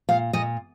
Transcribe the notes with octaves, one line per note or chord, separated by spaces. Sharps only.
A#2 F5
A#2 D#5